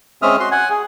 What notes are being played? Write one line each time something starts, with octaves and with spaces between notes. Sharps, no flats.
G#3 C4 C#4 E5 D#6 F6
F#4 C6
F#5 G#5
G#4